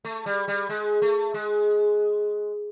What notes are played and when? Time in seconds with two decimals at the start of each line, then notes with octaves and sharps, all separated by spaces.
0.05 A3
0.26 G3
0.48 G3
0.69 G#3
1.02 A3
1.34 G#3